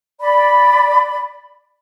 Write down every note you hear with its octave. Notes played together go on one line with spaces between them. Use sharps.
D5 B5